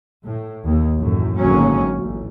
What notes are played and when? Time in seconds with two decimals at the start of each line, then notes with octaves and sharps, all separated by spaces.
0.23 A2
0.65 D#2
0.95 A1 F#2 A2
1.36 G#1 D2 A#2 F#3 A#3 C#4
1.94 A1